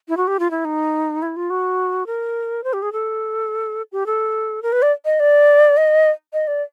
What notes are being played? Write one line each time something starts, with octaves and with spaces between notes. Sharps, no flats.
E4
F#4
G4
F4
E4
D#4
E4
F4
F#4
A#4
C5
G4
G#4
A4
G4
A4
A#4
B4
D5
D#5
D5
D#5
D#5
D5